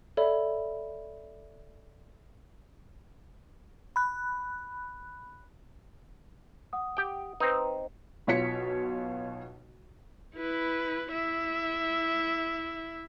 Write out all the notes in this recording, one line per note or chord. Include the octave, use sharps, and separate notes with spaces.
A4 C#5 D5 E5 B5
B5 F#6
F#5 D#6
G4 G5
C4 D#4 B4
B1 B2 F4 C#5 B6 C#7
E4 B4
E4 E5